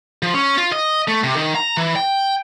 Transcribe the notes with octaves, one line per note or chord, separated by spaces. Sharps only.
F3
C#4
F4
D#5
A3
C3
D#3
A#5
E3
G5